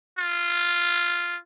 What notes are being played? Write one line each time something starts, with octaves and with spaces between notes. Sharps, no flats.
F4